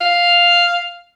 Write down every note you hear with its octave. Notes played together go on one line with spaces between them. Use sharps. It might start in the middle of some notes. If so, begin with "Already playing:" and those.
F5